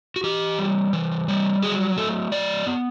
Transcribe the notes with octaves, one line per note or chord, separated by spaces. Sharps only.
F#4
E3 G4
G3
E3
G3
F#3 G#4
A3 A4
F#3 D5
B3